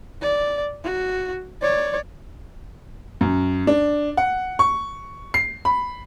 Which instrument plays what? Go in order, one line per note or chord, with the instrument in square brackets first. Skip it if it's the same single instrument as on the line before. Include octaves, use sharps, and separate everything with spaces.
[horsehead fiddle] D5
F#4
C#5 D5
[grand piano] F#2
D4
F#5
C#6
C7
B5